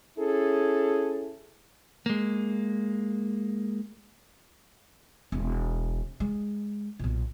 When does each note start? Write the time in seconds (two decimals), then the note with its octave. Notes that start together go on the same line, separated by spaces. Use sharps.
0.19 C#4 E4 G#4 A4
2.06 G#3 A#3
5.32 E1
6.20 G#3
6.99 B1 A#2